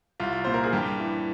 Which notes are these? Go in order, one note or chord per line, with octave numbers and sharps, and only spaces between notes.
C2 F4
A#2 C5
A#4
G#4
G2 G4
E3